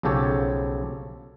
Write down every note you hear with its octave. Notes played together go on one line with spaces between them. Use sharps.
B1 C#3 F3 G4 A4 C#5